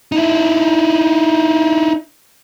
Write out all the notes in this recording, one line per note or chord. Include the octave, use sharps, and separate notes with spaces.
D#4 E4